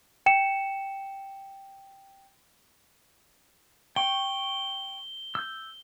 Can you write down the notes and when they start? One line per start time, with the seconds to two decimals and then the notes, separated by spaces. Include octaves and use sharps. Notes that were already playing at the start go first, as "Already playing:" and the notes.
0.26 G5 C#7 E7
3.96 G5 C#6 G7
5.35 E6 G6